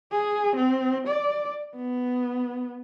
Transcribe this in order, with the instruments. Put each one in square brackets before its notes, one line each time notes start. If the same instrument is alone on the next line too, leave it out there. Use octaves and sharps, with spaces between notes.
[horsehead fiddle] G#4
C4
D5
B3